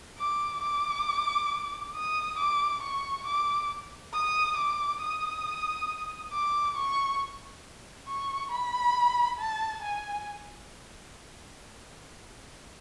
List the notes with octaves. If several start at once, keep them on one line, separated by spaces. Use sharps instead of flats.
D6
D6
D#6
D6
C#6
D6
D#6
D6
D#6
D6
C#6
C#6
B5
A5
G#5